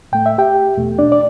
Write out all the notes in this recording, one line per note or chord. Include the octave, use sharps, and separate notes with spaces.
A2 A3 G5
E5
G4 G5
E2 B2 A3
D4 D5
D5